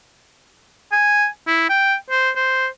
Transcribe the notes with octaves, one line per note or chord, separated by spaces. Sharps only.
G#5
E4
G5
C5
C5